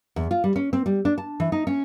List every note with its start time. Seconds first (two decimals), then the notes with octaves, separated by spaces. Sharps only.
0.16 E2
0.31 F4
0.44 G3
0.56 C#4
0.73 C4
0.86 G3
1.05 D4
1.18 A5
1.40 E3
1.52 D#4
1.67 C#4